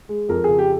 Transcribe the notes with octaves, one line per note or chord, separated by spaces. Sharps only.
G#3
F2 A#4
C#3 G#4
G4